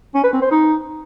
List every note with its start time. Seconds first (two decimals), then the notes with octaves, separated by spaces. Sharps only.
0.15 C#4
0.24 B4
0.33 C4
0.42 C5
0.51 D#4